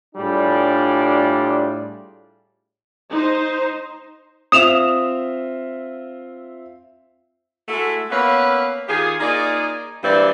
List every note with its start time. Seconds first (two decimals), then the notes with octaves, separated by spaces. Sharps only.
0.15 A2 G3 D4 F4 G#4
3.12 D#4 C5
4.52 C4 F4 E5 D#6 E7 F7
7.68 G#3 A3 E4 F#4 A4
8.11 A#3 B3 C#4 B4 E5 F5
8.88 D#3 F4 G4 G#4
9.20 A#3 D#4 F4 G#4 D5
10.03 D2 G2 E3 C4 D4 D5